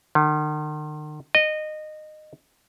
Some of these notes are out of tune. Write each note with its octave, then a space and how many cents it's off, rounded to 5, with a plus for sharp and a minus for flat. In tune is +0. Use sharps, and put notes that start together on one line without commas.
D#3 -45
D#5 -20